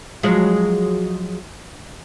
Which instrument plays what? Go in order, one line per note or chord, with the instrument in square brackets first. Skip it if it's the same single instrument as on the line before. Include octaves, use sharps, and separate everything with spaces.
[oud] F3 F#3 G#3